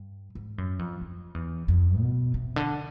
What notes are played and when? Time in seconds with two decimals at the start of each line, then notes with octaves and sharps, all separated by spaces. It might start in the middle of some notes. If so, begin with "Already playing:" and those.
Already playing: G2
0.35 G#2
0.58 F#2
0.79 F2
1.02 F2
1.34 E2
1.68 F2
2.01 B2
2.34 C3
2.56 D3